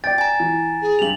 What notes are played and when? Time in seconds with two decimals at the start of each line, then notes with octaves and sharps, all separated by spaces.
0.04 D5 G5 A6
0.18 G#5 A#5
0.40 E3
0.82 G#4
0.99 G2 G4 F7 F#7